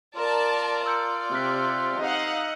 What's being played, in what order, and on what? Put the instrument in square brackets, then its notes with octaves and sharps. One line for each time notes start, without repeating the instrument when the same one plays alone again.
[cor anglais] F4 [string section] A#4 [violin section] D5 A5
[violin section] D5 [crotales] E6 G6 C#7
[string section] C3 [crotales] F6 F#6 B6
[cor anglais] D#4 [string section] D#5 F#5 [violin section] F5